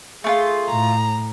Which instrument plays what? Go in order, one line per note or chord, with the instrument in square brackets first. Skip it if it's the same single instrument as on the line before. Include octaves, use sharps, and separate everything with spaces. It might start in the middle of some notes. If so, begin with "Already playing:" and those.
[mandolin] A3 D4 F4 [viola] G#4
[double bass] A2 [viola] A#5